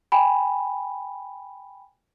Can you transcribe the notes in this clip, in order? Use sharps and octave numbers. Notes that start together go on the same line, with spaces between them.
G5 G#5 B5